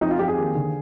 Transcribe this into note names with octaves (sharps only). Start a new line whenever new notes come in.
F2 D#4
F4
F2 G4
G#4
D#2
D3